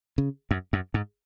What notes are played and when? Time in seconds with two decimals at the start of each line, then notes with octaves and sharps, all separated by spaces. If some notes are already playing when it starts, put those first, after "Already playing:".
0.18 C#3
0.51 F#2
0.73 F#2
0.94 G#2